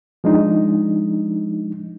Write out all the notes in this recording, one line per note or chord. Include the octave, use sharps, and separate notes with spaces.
F3 G#3 D4 D#4